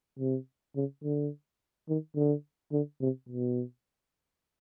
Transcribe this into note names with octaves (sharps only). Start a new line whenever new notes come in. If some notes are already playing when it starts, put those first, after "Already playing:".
C3
C#3
D3
D#3
D3
D3
C3
B2